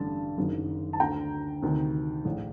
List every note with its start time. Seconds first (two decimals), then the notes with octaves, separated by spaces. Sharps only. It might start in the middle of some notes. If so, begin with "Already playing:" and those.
Already playing: A1 G2 D3 A5
0.37 F#1 F#2 D#3
0.93 A5
1.00 D2 D3 G5 A#5
1.63 D2 C3 D#3
2.25 A#1 A2